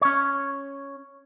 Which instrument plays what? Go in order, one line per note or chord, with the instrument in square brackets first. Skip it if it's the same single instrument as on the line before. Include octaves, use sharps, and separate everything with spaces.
[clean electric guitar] C#4 C#5